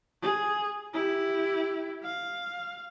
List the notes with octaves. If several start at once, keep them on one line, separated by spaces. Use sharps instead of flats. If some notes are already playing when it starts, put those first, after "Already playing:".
G#4
E4 G4
F5